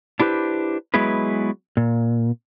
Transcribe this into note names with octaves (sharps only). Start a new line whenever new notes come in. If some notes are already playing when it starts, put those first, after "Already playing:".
D4 E4 G4 B4 C5
F#3 G#3 B3 E4 G#4 B4
A#2